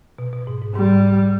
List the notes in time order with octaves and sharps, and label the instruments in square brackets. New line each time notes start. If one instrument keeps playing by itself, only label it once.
[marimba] B2
B2
G#2
G#2
[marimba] G#2 [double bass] G3